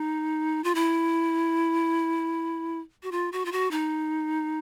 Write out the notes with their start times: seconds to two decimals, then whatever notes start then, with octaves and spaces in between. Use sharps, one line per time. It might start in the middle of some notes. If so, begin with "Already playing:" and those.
Already playing: D#4
0.64 F4
0.75 E4
3.03 F#4
3.12 F4
3.32 F#4
3.45 F4
3.52 F#4
3.71 D#4